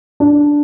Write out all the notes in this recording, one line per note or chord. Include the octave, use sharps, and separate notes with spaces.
D4